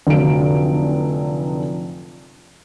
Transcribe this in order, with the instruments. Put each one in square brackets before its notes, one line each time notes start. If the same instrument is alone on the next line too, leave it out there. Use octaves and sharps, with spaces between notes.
[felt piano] F1 D3 F3 F#3 F4 D7